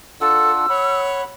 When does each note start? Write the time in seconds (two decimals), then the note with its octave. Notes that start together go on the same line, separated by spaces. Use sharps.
0.21 D4 F4 A4 F#5 E6
0.70 C#5 F#5 B5